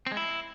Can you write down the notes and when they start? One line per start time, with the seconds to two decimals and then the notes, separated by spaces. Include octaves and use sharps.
0.07 C4
0.12 G#3
0.17 E4